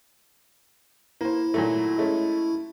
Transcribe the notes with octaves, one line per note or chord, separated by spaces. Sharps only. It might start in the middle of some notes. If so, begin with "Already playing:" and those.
A#3 E4 C5
A#2 F#3 A3
G#3 A3 C#4